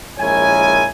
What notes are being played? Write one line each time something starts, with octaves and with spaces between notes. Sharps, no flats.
A#1 G#3 E4 A#4 C#5 G#5